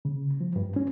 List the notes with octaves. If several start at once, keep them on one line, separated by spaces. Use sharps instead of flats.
C#3
F3
G2
C#4